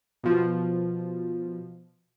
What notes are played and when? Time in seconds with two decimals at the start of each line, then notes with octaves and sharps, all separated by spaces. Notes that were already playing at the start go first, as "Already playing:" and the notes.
0.24 B2 F3